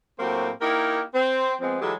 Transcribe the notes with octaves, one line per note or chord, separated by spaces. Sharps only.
A2 F#3 A#3 C4 F#4 G4
A#3 D#4 E4 G4 A#4
C4 C5
F3 G#3 B3 C4
E3 F#3 G#3 F4 G4 A4